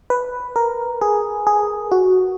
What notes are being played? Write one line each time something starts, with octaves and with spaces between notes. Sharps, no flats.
B4
A#4
G#4
G#4
F#4